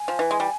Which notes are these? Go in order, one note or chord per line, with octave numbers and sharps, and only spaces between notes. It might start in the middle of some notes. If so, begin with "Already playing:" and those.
Already playing: G#5
F3
E3
G#3
G3